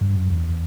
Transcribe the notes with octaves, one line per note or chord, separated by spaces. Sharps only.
G2
F#2
E2